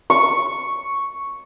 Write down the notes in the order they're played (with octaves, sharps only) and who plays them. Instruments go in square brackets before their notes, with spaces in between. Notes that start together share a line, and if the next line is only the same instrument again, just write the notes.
[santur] C#6